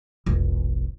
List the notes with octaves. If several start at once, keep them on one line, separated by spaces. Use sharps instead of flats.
E1 A#1